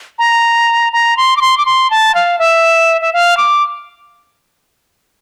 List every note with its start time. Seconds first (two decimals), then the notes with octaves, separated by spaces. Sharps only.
0.19 A#5
0.93 A#5
1.17 C6
1.37 D6
1.41 C6
1.58 D6
1.66 C6
1.90 A5
2.15 F5
2.39 E5
3.01 E5
3.13 F5
3.37 D6